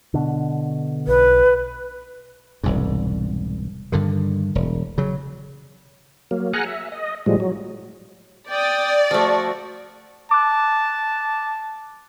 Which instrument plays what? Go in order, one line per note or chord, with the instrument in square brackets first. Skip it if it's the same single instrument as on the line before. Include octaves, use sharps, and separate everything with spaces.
[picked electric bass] B2 D3
[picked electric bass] B1 [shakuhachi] B4
[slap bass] E1 C2 G#2
G2 D3 D#3
E1
C#3 F#3
[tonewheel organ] F#3 A#3
G#4 F#5 G#5 A#5 F6 F#6
E5
D#5
A2 F3 G3 G#3
F#3
[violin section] D5 [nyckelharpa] G5 D#6
[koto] F3 A3 [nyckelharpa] F#4
[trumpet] A5 [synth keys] D6 F#6